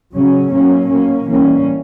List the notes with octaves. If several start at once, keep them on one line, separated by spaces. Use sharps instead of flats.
C#3 F#3 C#4
B2 F#3 A#3 C#4
B2 A#3 C#4
E3 G3 A#3 C#4